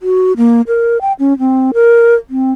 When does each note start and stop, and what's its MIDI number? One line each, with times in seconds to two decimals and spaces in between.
0.01 0.33 66
0.37 0.61 58
0.67 1.01 70
1.01 1.13 79
1.19 1.37 61
1.39 1.71 60
1.74 2.15 70
2.30 2.52 60